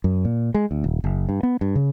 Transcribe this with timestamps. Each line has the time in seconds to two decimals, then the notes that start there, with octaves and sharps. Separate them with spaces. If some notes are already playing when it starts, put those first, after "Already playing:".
0.04 F#2
0.25 A#2
0.54 G#3
0.71 D2
0.84 D#1
1.04 F#1
1.29 G2
1.43 B3
1.61 G2
1.76 C#3